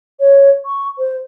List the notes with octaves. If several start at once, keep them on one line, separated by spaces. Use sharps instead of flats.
C#5
C#6
C5